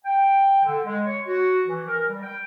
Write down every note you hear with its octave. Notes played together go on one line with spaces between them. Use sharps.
G5
D3
G#3
C#5
F#4
E3
A#4
G3
G5